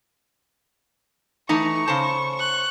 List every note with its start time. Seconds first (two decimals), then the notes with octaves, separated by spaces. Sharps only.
1.49 E3 A3 D#4 C#6
1.88 C#3 C5 A5
2.35 C#6 F#6